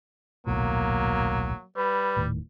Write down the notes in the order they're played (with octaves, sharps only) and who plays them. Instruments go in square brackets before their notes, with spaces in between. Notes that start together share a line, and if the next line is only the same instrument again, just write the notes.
[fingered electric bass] D#1 B1 A2 [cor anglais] F#3 [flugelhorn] A#3
[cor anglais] G3 [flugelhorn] B4
[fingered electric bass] D#1 A2 D#3